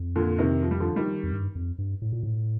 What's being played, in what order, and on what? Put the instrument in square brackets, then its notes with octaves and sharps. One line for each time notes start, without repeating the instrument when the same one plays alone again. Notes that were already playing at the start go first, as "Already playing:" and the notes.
Already playing: [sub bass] F2
[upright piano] A#2 D3
C3 D#3
F3
G3
D3 F3
D#3 G3
[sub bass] F2
G2
F2
G2
A2
A#2
A2